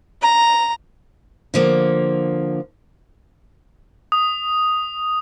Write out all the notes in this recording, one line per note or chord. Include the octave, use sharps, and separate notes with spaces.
A#5
D3 F3 A#3
D#6